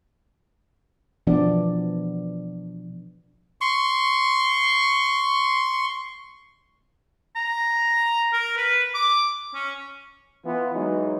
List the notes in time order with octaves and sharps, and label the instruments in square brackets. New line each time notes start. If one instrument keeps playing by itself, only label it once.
[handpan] B2 E3 F3 B3 D4 D5
[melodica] C6 C#6
[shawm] A#5
A#4
B4
D6
C#4
[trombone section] E3 B3 F4
E3 F#3 G#3 D#4